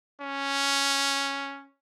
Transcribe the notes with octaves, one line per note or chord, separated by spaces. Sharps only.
C#4